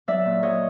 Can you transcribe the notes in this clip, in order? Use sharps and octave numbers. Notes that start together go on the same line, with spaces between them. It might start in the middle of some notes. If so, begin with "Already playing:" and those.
F#3 D5 E5
A#2
F#3 C#5 D#5